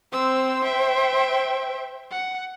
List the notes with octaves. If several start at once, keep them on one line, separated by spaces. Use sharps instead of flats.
C4 C5 E6
E5 G5
F#5